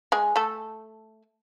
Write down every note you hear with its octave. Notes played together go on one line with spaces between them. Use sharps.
G#3 G#4
A3 A4